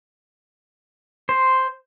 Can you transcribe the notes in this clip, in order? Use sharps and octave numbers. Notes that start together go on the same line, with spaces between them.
C5